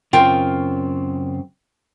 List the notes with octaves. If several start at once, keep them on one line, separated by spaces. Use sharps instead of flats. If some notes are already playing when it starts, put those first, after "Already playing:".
F#2 C#3 C4 F4 A#4 G5